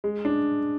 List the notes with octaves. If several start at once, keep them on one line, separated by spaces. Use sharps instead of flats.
G#3
D4